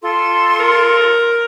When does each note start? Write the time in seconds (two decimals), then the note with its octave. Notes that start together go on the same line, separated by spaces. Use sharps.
0.02 F4 A4 C6
0.60 A#4